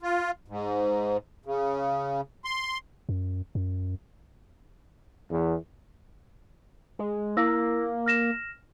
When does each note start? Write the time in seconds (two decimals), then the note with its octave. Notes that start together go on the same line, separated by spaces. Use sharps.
0.02 F4
0.48 G#2
1.45 C#3
2.45 C6
3.09 F#2
3.55 F#2
5.31 E2
6.99 G#3
7.37 A#3 E4 E6 A#6
8.06 F6 A#6 E7